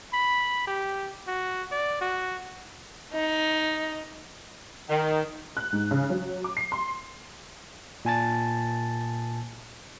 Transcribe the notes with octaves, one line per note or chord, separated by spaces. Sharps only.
B5
G4
F#4
D5
F#4
D#4
D#3
F#6
G#2
C#3
F#3
D6
C7
C6
A#2 G#5 A5 A6